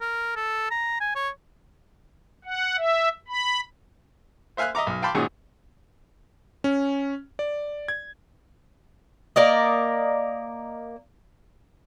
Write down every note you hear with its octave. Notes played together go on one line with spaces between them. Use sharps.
A#4
A4
A#5
G#5
C#5
F#5
E5
B5
C5 E5 F5 G#5 F6 F#6
D#5 E5 A#5 D6
B1 F6
F5 G5 A5 B5 C6 D6
G#1 A#2 D#3 C#4 F#4 G#4
C#4
D5
G#6
A#3 A#4 D5 D#5